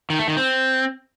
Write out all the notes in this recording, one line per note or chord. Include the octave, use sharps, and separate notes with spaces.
D#3
A3
D#3
C4